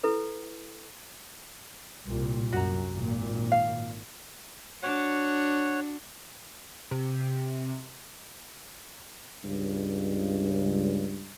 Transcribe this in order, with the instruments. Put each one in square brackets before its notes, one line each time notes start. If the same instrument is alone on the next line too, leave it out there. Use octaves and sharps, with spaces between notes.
[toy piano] E4 A4 B4
[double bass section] C2 A#2
[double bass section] F#2 [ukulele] F#4 A#5
[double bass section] G#1 A#2
[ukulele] F5
[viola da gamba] D4 F#4 [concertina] C#5 F#5
[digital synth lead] C3
[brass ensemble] C#2 G2